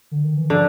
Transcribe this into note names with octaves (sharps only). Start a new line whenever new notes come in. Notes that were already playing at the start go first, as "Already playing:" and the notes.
D3
D#3
E3
D3 F3